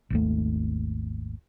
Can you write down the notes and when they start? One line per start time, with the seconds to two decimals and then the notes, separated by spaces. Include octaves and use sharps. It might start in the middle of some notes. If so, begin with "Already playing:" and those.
0.10 G#1 D#2 A3